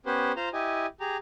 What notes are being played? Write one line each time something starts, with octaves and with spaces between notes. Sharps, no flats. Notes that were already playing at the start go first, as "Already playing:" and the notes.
B3 C#4 G4 B4 C5
F4 C5 A#5
E4 G4 D#5 G#5
G4 G#4 A#5